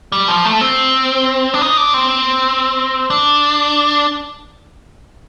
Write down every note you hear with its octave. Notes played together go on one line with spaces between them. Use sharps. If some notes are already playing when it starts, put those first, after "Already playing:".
G3
F3
A3
C4
D4
D#4
D4
C4
D4